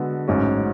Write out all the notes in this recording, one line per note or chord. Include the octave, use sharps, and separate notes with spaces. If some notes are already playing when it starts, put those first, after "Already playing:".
Already playing: D3 G#3 B3 F#4 A4
A1 G#2 F#3 C#4